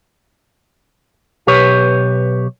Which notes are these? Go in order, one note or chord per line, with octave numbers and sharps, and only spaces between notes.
B1 B2 G4 B4 C#5